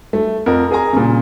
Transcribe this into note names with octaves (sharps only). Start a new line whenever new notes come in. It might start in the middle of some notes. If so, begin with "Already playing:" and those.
A3
F2 A#4
G#4 A#4 G#5 A#5
A#2 C#3